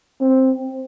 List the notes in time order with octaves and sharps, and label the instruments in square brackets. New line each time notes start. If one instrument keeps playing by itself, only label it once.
[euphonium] C4